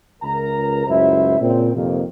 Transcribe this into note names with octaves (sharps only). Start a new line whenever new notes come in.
C#2 A#4 A#5
C#2 F#2 A2 E4 C5 E5
A#2 C#3 C4
F2 C3 D#3 A#3